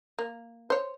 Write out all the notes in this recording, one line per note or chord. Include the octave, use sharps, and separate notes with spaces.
A#3
C5 C#5